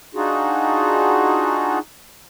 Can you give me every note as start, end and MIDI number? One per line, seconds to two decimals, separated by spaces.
0.15 1.79 62
0.15 1.79 63
0.15 1.79 65
0.15 1.79 66
0.15 1.79 68